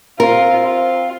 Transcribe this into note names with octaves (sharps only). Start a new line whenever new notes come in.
C4 F4 A#4
F4